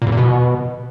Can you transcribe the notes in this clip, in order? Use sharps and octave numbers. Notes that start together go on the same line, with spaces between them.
A#2
E2
A#2
B2